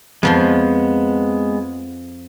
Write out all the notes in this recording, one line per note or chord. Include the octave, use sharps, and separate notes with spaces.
F2 F3 G#3 B3 C6